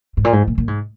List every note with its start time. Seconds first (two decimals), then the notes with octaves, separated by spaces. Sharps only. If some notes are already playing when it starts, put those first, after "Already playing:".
0.17 G#2
0.24 A#2
0.33 G#2
0.48 A#2
0.58 A#2
0.68 G#2